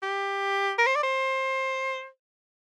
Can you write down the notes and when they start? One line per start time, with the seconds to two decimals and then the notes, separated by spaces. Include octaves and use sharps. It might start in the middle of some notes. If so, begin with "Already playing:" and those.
0.03 G4
0.78 A#4
0.87 C5
0.95 D5
1.03 C5